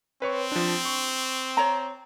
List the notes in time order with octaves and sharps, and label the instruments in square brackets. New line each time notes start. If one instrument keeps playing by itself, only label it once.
[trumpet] C4 [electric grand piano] B4 C#5 C#6
[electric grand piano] F3 D4
C#6
[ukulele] C#5 A#5